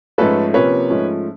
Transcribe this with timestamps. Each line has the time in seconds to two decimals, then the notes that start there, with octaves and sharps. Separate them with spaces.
0.18 G#2 F3 A3 C#4 A4 B4
0.54 C3 F3 A#3 C#4 B4 C#5
0.90 G#2 F3 A3 C#4